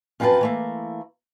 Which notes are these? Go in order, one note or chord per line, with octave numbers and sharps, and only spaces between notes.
F#2 F3 C4 A4 B4 A5
E3 A3 A#3